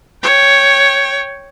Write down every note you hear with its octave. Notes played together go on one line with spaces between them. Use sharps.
C#5 G5